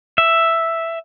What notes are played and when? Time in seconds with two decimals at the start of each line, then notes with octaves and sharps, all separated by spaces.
0.18 E5